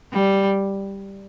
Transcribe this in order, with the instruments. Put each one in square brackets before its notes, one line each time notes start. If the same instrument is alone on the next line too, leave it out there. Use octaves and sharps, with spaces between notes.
[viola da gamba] G3